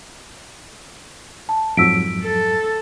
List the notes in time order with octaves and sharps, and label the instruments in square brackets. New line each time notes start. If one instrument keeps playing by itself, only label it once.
[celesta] A5
[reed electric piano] F2 G#2 F#3 [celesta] E6 B6 D7
[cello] A4